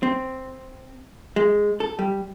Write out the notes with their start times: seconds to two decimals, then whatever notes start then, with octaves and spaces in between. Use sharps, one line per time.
0.03 C4
1.36 G#3
1.80 A4
1.99 G3